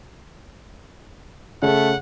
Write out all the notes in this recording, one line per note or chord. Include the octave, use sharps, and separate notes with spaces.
C#3 A3 F#5